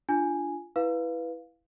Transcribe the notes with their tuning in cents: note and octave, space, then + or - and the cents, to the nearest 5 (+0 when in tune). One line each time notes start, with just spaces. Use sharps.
D4 +0 F4 -15 G#5 +0
E4 +0 B4 +0 F5 +0